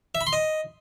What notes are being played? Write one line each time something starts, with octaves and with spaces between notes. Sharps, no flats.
E5
B5
C6
D#5